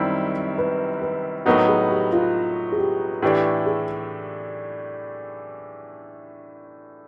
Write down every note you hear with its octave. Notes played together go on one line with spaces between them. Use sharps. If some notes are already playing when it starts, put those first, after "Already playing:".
Already playing: F#2 D#3 G3 C4 E4
B4
B4
A2 F#3 B3 D#4 F#4 A#4
G#4
G4
F4
G#4
G4
A2 E3 A3 D4 G4
G#4